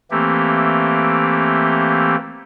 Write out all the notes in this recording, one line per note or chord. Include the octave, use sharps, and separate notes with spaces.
E3 A3 A#3 C4 G4